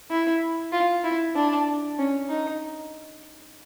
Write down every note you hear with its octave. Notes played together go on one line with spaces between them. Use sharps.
E4
F4
E4
D4
C#4
D#4